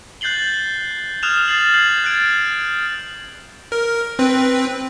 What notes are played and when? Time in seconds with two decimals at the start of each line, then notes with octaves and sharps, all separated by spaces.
0.21 F#6 G6 A6 C7 F#7 G7
1.23 D#6 F6 F#6 G#6 E7 F7
1.48 A6 C7 F#7
1.74 G6 G#6 C7 F#7
2.04 F#6 G#6 A6 D7
3.72 A#4
4.19 C4 B4